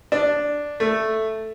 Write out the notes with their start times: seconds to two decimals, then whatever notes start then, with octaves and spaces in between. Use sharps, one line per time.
0.12 D4
0.80 A3